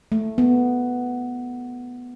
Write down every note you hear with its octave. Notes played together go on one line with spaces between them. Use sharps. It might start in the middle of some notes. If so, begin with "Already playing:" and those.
A3
B3